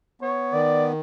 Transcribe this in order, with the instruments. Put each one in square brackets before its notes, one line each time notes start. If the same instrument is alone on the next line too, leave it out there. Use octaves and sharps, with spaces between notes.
[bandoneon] B3 [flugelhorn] C#5
[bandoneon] D#3 [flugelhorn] D5